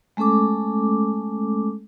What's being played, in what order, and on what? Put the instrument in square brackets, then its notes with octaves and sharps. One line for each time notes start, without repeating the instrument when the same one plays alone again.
[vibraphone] G#3 A3 C#4 A4 D6